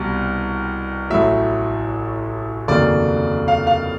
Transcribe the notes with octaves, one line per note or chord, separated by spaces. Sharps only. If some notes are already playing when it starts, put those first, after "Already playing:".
Already playing: C2 B2 G3
A1 A2 F#3 E5
F1 D#2 C#3 F#3 D5
F5
F5